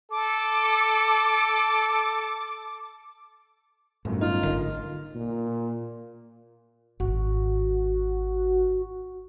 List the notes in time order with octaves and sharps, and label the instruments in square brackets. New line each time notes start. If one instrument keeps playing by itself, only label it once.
[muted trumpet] A4 [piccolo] D6
[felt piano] G1 F#2 [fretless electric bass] A2
[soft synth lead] D#4 [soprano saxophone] F4
[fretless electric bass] G#1 D3 [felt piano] A#4 D#5
[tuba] A#2
[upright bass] G#1 [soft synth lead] F#4